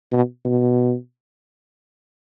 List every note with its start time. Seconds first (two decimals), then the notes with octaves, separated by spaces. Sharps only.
0.12 B2
0.45 B2